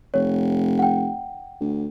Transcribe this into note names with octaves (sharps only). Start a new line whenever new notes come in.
F1 C#5
F#5 G5
D2